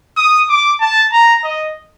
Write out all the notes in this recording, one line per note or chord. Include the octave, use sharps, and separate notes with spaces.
D#6
D6
A5
A#5
D#5